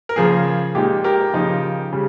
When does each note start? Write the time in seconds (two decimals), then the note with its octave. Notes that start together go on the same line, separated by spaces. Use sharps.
0.09 A#4
0.16 C#3 F3 A#3 G#4
0.75 A#2 G#3 D#4 G4
1.04 G4 A#4
1.33 C#3 F3 A#3 D#4
1.93 C#3 G3